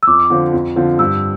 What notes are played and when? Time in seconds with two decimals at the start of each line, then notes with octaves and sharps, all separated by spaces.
0.03 E6
0.07 F2 D6
0.30 D3 F3 C4 F4
0.53 F2
0.76 D3 F3 C4 F4
0.99 G2 E6